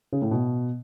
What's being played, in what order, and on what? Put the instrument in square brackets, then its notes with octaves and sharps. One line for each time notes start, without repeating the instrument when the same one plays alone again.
[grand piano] C#3
A2
B2